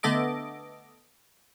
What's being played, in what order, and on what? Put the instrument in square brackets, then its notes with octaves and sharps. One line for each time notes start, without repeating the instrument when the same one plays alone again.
[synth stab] D3 A3 B3 A4 D#5 D6